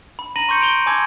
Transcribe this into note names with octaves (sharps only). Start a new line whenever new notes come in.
B5
A#5 B5 A#6 D#7 F#7
C6 C#6 G6 C#7
D7 F7 G7
G#5 A5 B5 D6 E6 G#6